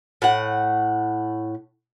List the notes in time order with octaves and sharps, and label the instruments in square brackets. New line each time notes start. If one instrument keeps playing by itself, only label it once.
[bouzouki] A2 F#5